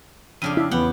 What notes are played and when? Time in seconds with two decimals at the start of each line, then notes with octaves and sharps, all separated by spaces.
0.42 F2 C#3 D4 F5 D#7
0.57 D4 E4
0.71 E2 B3 G4 F#5